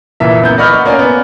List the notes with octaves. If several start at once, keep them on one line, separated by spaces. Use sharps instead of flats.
F#1 A#2 E3 E5
F#2 B3 G6
D5 D#5 F#5 B5 C#6 F6
A#3 C#4 D5 G#5
B3